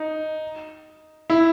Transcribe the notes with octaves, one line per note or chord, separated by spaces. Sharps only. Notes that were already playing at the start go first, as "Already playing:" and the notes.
Already playing: D#4
E4